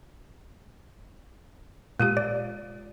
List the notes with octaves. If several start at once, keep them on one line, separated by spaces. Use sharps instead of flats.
A#2 G#3 F4 G4
D5